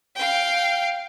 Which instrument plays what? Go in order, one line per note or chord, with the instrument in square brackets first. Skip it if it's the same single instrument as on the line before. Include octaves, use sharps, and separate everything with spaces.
[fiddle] F5 G5